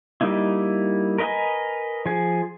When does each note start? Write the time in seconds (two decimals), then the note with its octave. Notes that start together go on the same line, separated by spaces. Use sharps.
0.21 G3 A#3 D#4 E4
1.18 A#4 B4 D#5 F5 G#5
2.06 F3 G#4